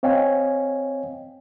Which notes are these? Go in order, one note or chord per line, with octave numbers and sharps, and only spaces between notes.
C4 C#5 D#5 F5 G5 G#5